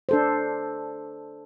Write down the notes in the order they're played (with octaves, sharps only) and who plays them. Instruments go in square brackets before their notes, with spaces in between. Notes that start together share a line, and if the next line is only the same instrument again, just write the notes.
[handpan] D4 A4 C5